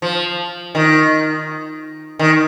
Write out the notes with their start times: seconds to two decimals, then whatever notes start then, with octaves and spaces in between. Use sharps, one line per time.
0.02 F3
0.75 D#3
2.19 D#3